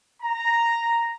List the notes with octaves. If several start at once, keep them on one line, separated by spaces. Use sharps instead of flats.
A#5